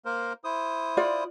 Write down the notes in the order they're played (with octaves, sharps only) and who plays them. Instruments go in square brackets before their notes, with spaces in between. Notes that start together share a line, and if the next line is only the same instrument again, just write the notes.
[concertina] A#3 A#4 C5
E4 C5 D#6
[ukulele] F4 D5